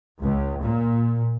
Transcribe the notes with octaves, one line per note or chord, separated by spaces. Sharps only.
C#2
A#2